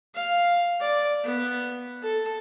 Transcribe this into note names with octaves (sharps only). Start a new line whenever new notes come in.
F5
D5
B3
A4